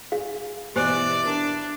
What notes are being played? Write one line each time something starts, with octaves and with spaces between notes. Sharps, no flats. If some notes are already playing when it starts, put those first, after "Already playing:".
G#4 F5
B2 E3 G4 C5 D5 G#5
D4 A#4